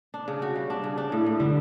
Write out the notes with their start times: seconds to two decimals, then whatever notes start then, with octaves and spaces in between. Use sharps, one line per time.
0.14 D4
0.28 C#3
0.42 F#4
0.56 G3
0.70 D4
0.84 C#3
0.98 D4
1.12 A2
1.26 A2
1.40 D3 G3